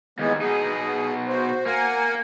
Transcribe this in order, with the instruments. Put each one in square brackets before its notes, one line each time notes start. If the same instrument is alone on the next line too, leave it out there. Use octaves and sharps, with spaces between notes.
[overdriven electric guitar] D#2 [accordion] E3 G#3 B3
[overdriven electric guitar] B2 D#4 [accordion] G#4
[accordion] F#4 C5
[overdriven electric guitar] A#3 [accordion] A#4 F#5 G#5